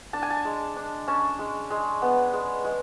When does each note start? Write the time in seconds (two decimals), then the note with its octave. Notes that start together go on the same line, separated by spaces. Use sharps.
0.13 D4 A5
0.22 G#5
0.30 A5
0.45 G#3
0.76 D4
1.08 C#4 A5
1.39 G#3
1.70 G#3
2.02 B3
2.33 G#3
2.64 G#3